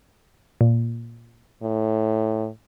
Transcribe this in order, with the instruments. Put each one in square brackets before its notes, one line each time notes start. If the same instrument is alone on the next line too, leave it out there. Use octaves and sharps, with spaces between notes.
[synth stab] A#2
[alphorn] A2